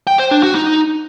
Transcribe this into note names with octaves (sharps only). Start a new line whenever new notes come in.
G5
C5
D4
F#4
D#4